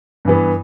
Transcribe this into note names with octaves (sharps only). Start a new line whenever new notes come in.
G2 E3 B3